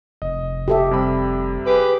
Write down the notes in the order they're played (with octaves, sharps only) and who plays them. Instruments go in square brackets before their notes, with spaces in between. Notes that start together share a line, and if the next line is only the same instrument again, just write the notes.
[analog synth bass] F1 [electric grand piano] D#5
[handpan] G4 A4 E5
[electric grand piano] C3 G3 B5
[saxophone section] G4 G#4 B4